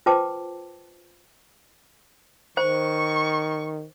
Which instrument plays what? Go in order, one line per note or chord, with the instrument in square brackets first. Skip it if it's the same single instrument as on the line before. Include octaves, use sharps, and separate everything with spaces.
[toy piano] F4 B4 C5 G5 A5 D6
[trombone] D#3 [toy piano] C5 [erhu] C#6